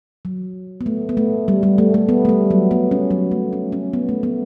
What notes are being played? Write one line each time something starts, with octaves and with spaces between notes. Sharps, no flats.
F#3
B3
A3
B3
A3
G3
G3
A3
A3
B3
A3
G3
F#3
B3
C#4
F#3
A3
C#4
C#4
B3
A3
B3